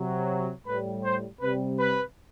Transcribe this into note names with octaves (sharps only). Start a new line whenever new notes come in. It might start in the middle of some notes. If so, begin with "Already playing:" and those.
Already playing: C3 F#3
A2 G3 B4
C5
C3 G3 B4
B4